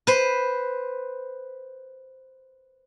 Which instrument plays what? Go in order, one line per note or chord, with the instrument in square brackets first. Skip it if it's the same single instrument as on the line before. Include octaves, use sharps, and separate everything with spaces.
[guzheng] B4 C5